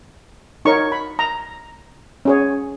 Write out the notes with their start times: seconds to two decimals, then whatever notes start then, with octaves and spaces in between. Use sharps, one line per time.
0.65 D#4 A#4 C#5 C#6
0.92 B5
1.19 A#5
2.25 C#4 G#4 C#5